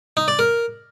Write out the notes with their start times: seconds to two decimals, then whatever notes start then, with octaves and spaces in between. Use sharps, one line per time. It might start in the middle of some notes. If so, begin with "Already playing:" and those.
0.17 D#4
0.28 D5
0.39 A#4